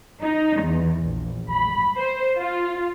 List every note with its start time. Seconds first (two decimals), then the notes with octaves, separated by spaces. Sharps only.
0.21 D#4
0.61 E2
1.00 A#1
1.52 B5
1.96 C5
2.38 F4